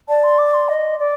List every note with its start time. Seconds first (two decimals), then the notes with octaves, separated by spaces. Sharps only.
0.08 D5 A5
0.24 C6
0.38 D6
0.54 C6
0.69 D#5
1.00 D5